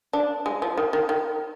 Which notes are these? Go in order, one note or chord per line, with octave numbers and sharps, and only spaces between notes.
D4
G#3
F3
D#3
D#3
D#3